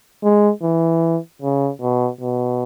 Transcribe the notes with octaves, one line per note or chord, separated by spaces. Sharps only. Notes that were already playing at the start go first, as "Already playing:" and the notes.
G#3
E3
C#3
B2
B2